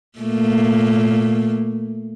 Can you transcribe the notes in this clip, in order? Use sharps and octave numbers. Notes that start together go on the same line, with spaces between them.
A#2 A3 A#3